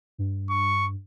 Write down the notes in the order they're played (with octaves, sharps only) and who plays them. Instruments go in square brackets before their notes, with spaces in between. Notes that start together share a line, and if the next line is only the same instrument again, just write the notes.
[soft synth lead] G2
[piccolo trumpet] C#6